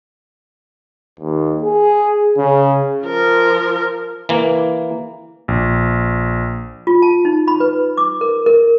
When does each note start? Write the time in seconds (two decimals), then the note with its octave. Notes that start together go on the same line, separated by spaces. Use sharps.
1.20 D#2
1.62 G#4
2.38 C#3
3.05 F3 A#4
4.29 E3 A#3
5.48 A#1
6.87 F4
7.02 A5
7.25 D#4
7.48 B5
7.60 B4
7.97 D6
8.21 A#4
8.46 A#4